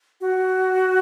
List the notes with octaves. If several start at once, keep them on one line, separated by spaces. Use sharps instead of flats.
F#4